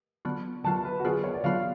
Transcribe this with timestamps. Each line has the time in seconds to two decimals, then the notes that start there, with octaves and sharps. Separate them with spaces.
0.25 D3 F#3 B3 F4
0.64 D3 F#3 B3 F4 A5
0.85 B4
1.00 F#4
1.05 D3 F#3 B3 F4 G#4
1.24 C#5
1.34 D5
1.44 D3 F#3 B3 F4 F5